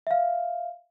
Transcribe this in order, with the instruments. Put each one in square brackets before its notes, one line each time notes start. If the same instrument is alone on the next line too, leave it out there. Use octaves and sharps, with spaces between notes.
[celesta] E5 F5